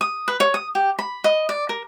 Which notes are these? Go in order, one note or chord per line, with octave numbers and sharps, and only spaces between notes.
D#6
B4
C#5
D#6
G4
B5
D#5
D5
A#4